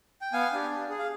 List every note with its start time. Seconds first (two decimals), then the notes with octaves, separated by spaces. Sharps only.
0.22 G5
0.33 B3 F5 G#5
0.52 D4 G4
0.70 D4
0.90 G#4
0.99 F5